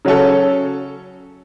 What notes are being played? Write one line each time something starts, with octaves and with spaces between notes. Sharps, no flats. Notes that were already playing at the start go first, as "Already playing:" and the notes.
C#3 F#3 C#4 A4